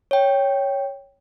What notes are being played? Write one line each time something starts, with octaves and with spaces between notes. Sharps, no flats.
C#5 G5